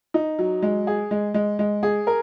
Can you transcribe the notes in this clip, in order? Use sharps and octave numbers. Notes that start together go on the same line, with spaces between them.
D#4
F#3
G#3
G#4
G#3
G#3
G#3
G#4
A#4